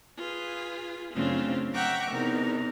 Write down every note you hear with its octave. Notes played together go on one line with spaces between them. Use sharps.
F4 G#4 B4
F#2 C#3 A3 C4 D4 F4
E5 F#5 G5 A#5 C#6 D6
E2 C3 D#4 A#4